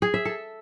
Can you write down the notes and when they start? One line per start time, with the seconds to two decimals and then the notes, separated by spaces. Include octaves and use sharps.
0.02 G#4
0.14 E5
0.25 A4